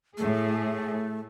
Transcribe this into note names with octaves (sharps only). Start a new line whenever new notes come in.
A2 A3 G#4